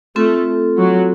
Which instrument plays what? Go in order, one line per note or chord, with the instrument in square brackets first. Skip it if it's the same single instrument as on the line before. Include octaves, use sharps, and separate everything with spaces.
[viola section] A3 [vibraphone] C4 F4 A4
[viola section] F#3